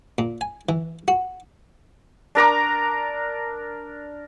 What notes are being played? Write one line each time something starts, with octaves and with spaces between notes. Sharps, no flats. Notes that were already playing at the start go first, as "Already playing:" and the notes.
A#2
G#5
E3
F#4
D4 A#4 A#5 D6